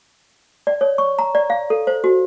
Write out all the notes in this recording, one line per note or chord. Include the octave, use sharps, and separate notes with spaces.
D5
C#5
C#6
A#5
D5
F5
A4
C5
F#4